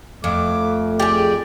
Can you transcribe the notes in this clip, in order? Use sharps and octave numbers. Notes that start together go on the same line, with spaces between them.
F2 A3 D6
G4 G#4 D5